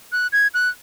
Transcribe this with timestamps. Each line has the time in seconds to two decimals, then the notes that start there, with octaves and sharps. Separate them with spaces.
0.12 F#6
0.33 G#6
0.54 F#6